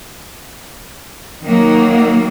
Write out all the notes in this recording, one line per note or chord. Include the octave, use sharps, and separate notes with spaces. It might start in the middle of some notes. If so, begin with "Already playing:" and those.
D#3 F#3 A#3